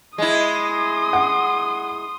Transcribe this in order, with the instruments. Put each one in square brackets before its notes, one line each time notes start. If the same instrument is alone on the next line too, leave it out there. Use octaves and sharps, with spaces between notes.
[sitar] G#3 E4 [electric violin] C6 D#6
[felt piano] F#5